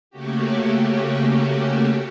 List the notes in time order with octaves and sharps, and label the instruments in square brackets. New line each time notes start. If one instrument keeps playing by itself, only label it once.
[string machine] C#3 A3 A#3 C#4 F#4 G4